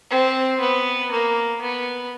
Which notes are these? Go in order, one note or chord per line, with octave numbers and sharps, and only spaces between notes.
C4
B3
A#3
B3